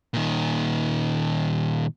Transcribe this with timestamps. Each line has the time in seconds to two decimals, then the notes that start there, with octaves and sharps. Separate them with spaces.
0.14 A#2 D#3